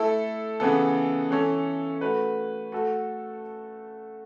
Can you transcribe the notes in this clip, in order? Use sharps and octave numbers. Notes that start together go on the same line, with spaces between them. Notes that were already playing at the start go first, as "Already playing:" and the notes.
Already playing: A3 E4 A4
C#3 E3 B3 A4
E3 C#4 A4
A3 F#4 B4
A3 F#4 A4